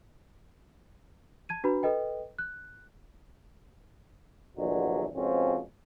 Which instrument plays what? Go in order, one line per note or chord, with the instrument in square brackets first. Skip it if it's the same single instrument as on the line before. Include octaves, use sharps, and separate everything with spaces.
[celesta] A5 G#6 D#7
D4 F#4 B4 A#5 B5
A4 B4 D#5 G5
F#6
[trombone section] A#1 E2 G2 D3 F#3 G#3
F2 G#2 B2 F3 C4 C#4